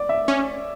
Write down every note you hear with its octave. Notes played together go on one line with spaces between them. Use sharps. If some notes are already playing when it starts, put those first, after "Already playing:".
Already playing: D5
E5
C#4